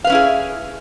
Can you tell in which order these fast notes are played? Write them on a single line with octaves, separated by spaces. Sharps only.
F5 B4 C#4 E4 G#4